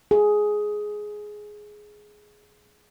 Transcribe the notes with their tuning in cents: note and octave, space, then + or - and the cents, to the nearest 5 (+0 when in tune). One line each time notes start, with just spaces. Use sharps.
G#4 +10